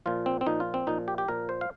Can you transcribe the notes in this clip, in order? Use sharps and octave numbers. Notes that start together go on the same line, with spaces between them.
A#2 F3 F4
C4
C4
A#2 F3 D#4
F4
C4
A#2 F3 D#4
G4
G4
A#2 F3 A#4
C5
F5